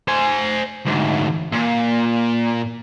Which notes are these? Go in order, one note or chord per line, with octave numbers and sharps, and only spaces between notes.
C5 G#5
D2 G#2
A#2